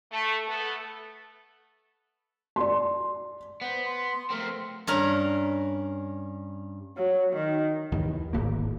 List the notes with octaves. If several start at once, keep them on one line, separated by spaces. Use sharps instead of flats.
A3
A3 B3 A4
D5 C6
B3 C5
C6
A3 C4 A#4
G2 C#4 A#4 A#5
F#3
D#3
D#2 D#3 E3
D1 G#1 A#3